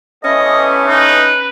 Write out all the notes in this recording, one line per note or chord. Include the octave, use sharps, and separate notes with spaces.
E3 A3 B3 C#4 D#5
D#4 B4